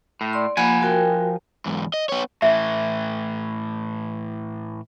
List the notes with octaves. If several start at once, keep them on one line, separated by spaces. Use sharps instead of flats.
A2
D5 C6
F3 A#3 F#5 G#5 B5
F#4 A#4 G5
E2 G#2
D#5
B3 C#5
A2 E3 E5